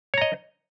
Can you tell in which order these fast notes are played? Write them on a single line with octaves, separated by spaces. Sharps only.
C#5 A#5 D#5